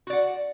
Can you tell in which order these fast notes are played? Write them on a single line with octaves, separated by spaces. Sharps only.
F#4 D5 F#5